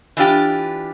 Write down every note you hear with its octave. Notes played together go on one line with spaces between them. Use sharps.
E3 D4 F4 G4